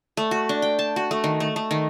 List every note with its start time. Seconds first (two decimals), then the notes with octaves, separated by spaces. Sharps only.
0.17 A3
0.31 F#4
0.49 D4
0.62 G5
0.79 A5
0.96 F#4
1.11 A3
1.24 D#3
1.40 A3
1.56 A3
1.71 D#3